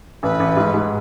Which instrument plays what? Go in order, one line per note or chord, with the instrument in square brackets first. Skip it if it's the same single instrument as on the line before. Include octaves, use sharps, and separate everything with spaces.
[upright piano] A1 [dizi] B4
[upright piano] A1
G#2
G#2